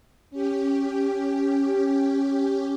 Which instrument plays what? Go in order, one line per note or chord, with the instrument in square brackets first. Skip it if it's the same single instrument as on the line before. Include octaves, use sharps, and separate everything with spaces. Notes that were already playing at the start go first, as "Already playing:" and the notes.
[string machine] C#4 G4